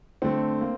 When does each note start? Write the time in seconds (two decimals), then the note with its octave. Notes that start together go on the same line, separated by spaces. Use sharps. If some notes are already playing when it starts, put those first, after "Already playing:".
0.22 D3 A3 C4
0.61 A#3